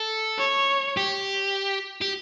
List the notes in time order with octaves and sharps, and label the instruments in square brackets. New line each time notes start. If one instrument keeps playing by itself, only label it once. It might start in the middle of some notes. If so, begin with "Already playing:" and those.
Already playing: [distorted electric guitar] A4
[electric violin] C#5
[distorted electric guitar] G4
G4